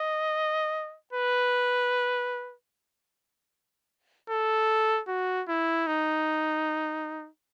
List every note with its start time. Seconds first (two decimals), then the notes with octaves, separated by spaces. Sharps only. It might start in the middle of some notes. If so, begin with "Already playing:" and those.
Already playing: D#5
1.13 B4
4.30 A4
5.08 F#4
5.48 E4
5.87 D#4